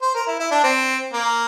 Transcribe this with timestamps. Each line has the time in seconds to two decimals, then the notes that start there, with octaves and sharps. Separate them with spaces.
0.02 C5
0.15 A#4
0.27 E4
0.40 E4
0.51 D4
0.64 C4
1.13 A#3